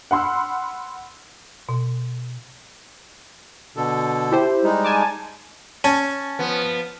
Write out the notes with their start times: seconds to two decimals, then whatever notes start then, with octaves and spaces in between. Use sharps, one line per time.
0.11 F#5 B5 C6 E6 F6
1.69 B2
3.76 B2 D3 A4
4.32 E4 G4 C5
4.64 G3 G#3 D#4
4.85 G#5 A5 D6
5.84 C#4 A5
6.39 F3 B3